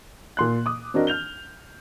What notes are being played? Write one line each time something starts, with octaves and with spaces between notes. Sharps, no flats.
A#2 C6 F#6
D6 D#6
C4 D4 F#4 A#4 D#5
F6 G6 F7 G7